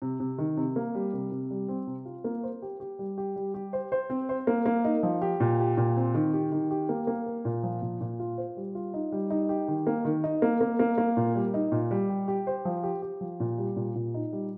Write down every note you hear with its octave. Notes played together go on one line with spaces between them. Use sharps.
C3
C3
D#3
C3
A#3
G3
C3
C3
G3
C4
C3
F4
A#3
C5
G4
G4
G3
G4
G3
G4
C5
C5
C4
C5
A#3
A#3
D#4
F3
G4
A#2
G4
A#2
C4
D#3
G4
D#3
G4
A#3
A#3
A#4
A#2
F3
A#2
A#2
F4
C5
G3
F4
D#4
G3
D#4
G4
D#3
A#3
D#3
D#4
A#3
A#3
A#3
A#3
A#2
G3
D#4
A#2
G3
G4
G4
C5
F3
G4
G4
F3
A#2
G3
A#2
A#2
D#4
G3